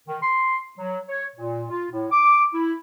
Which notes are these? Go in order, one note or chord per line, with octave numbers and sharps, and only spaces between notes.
D#3
C6
F#3
C#5
A#2
F4
A2
D6
E4